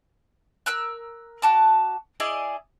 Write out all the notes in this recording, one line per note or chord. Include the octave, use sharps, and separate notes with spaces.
A#4 E6 F#6
F#4 A5 D6
E4 G#4 D5 D#5